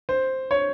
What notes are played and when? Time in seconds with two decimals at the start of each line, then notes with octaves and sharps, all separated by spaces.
0.09 C5
0.51 C#5